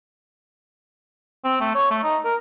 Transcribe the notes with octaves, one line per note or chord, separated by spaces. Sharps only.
C4
A3
C#5
A3
D#4
A#4